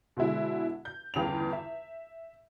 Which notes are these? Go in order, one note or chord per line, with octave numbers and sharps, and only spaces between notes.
B2 D3 G#3 E4
G6
G1 E2 C#3 G5 F7
E5